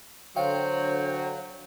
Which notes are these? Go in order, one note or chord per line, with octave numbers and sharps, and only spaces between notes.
D3 F#3 C5 F5 G5